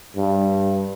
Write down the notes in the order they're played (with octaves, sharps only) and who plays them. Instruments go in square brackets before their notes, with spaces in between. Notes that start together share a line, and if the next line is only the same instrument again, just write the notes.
[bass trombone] G2